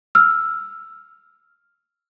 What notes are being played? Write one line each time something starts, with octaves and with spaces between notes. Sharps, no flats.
E6 F6